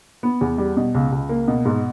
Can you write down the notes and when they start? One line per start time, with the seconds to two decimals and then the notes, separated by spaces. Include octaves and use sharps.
0.23 B3
0.41 E2
0.58 G3
0.77 B2
0.94 C#2
1.12 C#2
1.29 A#3
1.48 B2
1.65 G#2